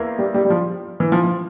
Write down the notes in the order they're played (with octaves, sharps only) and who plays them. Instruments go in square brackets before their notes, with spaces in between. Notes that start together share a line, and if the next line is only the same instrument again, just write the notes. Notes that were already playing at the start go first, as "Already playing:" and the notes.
Already playing: [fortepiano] E2 E3 A#3
[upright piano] G3
G3
G3
F3
E3
F3
F3